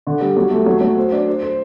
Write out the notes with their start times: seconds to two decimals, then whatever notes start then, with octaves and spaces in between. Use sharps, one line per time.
0.07 D3
0.21 G3
0.36 F#3
0.51 A3
0.66 F#3
0.81 F#3
0.97 C5
1.12 D4
1.27 C5
1.43 C5